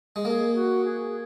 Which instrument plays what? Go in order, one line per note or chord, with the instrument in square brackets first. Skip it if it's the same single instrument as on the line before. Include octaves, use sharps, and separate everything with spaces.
[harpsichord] G#3
[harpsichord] A#3 [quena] A#4
[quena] G#4
F#4
G#4